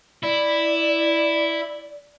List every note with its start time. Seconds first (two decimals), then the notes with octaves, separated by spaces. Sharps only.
0.23 E4 D5